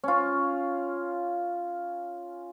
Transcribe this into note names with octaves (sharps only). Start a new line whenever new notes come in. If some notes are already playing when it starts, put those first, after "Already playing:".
C#4 F4